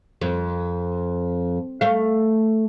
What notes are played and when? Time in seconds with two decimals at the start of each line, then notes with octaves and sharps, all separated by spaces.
0.21 F2
1.81 A3 F5